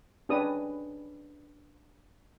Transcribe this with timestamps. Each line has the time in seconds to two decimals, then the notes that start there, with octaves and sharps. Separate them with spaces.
0.29 C#4 D4 G4 B4 D#6